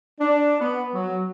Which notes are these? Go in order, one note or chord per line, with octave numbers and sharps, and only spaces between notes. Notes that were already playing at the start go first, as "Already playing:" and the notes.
D4
B3
F#3